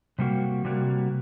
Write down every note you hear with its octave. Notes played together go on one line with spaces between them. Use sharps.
C3 G3 A#3 F#4
C3 G3 A#3 F#4